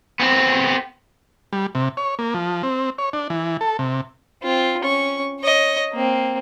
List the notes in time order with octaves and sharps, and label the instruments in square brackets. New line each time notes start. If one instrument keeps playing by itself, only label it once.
[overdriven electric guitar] B3 C4
[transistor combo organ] G3
C3
C#5
A#3
F3
C4
C#5
D4
E3
A4
C3
[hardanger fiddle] C4 F4
C#4 C#6
C#5 D#5
A#3 C4